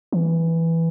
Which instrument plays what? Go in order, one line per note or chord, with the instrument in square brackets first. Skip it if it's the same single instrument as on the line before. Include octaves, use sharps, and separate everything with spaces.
[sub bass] E3